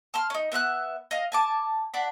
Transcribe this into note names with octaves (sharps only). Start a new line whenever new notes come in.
A5 C6 F6
C#4 D#4
B3 E5 B5 F#6
D#5 F5
G#5 A5 D6
D4 F#5 B5